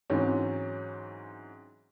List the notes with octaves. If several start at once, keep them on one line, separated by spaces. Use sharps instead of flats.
G#2 E3 F#3 C4 C#4